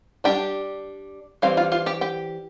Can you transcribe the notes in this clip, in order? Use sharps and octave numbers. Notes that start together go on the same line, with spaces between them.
G3 D4 G4 G5
E3 G3 C4 F5
F4 F5
F4 F5
G4 G5
G4 G5